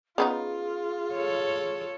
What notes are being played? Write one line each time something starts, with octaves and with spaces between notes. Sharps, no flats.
C#3 B3 D#4 F4 G#4
A4 C#5